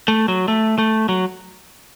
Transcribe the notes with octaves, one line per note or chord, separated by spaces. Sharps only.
A3
F#3
A3
A3
F#3